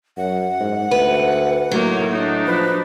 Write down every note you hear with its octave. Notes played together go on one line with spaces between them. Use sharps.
F#2 F#5
G#2
D2 B4
A2 D#3 F#3 A#3
D4 D#4
F3 B4